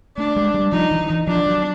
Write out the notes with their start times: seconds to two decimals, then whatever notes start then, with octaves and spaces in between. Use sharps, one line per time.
0.17 A3 D4
0.36 G#3
0.54 G3
0.72 F3 D#4
0.91 E3
1.10 E3
1.27 F3 D4
1.46 F#3